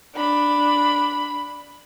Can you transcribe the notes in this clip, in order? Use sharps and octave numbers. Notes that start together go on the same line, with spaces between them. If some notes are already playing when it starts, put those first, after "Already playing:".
D4 B5